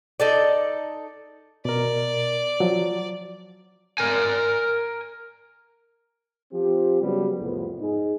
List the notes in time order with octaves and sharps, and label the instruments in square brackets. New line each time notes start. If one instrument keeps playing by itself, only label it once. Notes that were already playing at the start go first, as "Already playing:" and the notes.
[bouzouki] D#4 A4 D5
[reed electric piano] B2 A#4 [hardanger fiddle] D5
[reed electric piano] F3 F#3
[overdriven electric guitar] A#4 G#5
[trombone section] F3 C4 G4
C#3 F#3 G3 B3
C2 F2 A2 B3
G#2 D#4 G#4